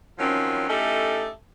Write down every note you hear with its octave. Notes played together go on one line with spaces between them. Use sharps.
D#3 F3 F#3 C4 C#4
A3 C#4 D#4 E4 G4 A4